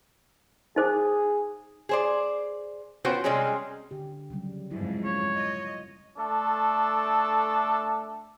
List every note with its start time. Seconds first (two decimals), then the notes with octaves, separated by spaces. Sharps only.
0.76 D#4 G#4 C5 D6
1.89 G#4 C5 D5
3.05 B3 C#4 F4 F#4 C5 G5
3.24 C3 G3 G#3 C4 C#4 G#4
3.91 D3 G4
4.30 C#3 F#3 G3
4.71 F2 G#2 F#3 E4
5.05 A#3 C#4 F4 C#5
5.37 D#5
6.18 A3 D4 A4